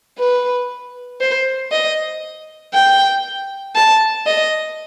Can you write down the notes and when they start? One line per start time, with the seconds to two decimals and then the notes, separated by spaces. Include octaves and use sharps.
0.18 B4
1.20 C5
1.72 D#5
2.74 G5
3.75 A5
4.26 D#5